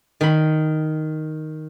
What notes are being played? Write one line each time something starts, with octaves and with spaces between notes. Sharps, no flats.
D#3 B5